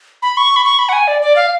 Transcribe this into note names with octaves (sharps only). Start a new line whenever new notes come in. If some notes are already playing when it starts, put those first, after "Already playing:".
B5
C#6
B5
C#6
B5
F#5
G#5
D5
D5
F5